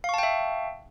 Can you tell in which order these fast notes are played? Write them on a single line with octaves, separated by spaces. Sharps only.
F5 C#6 A5 G5 E5